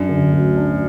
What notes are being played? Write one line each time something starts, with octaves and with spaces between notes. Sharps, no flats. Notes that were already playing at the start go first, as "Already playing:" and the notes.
Already playing: F#2 F#3 D4
D3
D2
D4